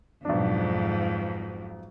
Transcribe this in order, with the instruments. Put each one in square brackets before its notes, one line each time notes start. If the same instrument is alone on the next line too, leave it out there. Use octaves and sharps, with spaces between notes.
[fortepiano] B1 D4 [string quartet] F2 G#2